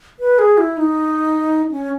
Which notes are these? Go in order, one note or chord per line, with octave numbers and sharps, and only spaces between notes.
B4
G#4
E4
D#4
C#4